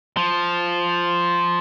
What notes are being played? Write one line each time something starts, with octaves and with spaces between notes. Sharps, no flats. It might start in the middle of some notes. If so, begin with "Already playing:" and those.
F3